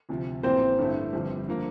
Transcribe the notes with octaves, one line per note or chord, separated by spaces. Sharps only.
D2 C3 F3
A1 A2 E3 A#3 C4 C5
G2 D3 A3 E4
G1 F2 D3 G3 C4
D3 F3 A#3